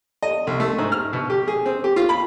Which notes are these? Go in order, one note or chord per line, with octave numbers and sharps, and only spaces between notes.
D#5
C2
A3
G#2
F6
B2
G4
G#4
C4
G4
F4
B5